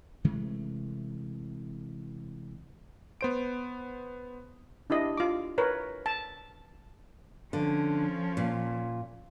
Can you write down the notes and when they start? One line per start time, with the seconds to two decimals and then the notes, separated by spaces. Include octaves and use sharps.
0.24 C3 E3 G#3 A3
3.21 B3 C5 D7
4.90 D4 E4 G4 D#5
5.17 F4 D6
5.58 A#4 B4 C#5
6.06 A5
7.53 D3 F3 C#4
8.37 A#2